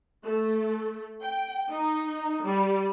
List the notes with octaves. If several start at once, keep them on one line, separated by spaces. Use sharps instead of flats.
A3
G5
D#4
G3